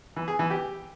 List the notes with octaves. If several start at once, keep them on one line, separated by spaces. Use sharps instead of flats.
E3
G#4
E3
G4